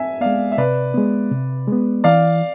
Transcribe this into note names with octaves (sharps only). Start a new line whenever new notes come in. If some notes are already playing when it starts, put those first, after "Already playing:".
Already playing: E5 G#5
G#3 B3 D5 F5
E5
C3 B4 D5
G#3 B3
C3
G#3 B3
E3 D5 F5